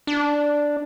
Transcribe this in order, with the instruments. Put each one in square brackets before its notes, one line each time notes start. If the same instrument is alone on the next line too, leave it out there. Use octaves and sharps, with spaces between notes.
[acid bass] D4